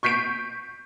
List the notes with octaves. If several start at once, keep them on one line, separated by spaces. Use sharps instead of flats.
C#6 G6 B6 C7 D7